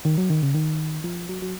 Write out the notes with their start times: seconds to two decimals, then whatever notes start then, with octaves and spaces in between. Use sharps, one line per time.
0.05 D#3
0.18 F#3
0.30 D#3
0.43 C#3
0.54 D#3
1.04 F3
1.29 F#3
1.42 F#3